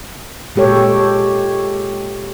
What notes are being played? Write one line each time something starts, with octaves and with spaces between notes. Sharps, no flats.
A#2 G#3 G4 A4 C#5